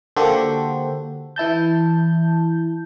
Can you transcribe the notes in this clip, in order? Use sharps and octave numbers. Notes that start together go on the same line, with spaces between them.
D3 A#3 F#4 G4 A4 C5
E3 E4 A5 G6